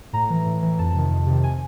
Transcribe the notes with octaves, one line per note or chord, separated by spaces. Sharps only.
A2 A#5
E3
A2
E3
F2 A5
C3 D#3
F2
C3 D#3
G#5